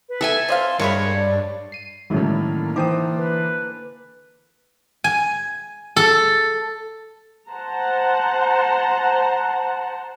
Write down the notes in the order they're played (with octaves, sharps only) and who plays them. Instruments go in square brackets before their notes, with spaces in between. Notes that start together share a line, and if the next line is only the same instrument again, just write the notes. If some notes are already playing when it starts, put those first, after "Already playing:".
[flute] B4
[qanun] A4 E5 G#5
[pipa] C4 D#5 F5 [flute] C6
[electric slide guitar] G2 [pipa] C3 G#3 B5 [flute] A#4 [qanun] C#5
[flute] D5
[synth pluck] C7 D#7
[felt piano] A2 D#3 E4 [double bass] D3 A#3 [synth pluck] F#3 G#3 C#4
[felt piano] E3 C5 D6 [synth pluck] D#4 G5 D#6
[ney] B4
[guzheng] G#5
A4
[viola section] C5 F#5 A5 A#5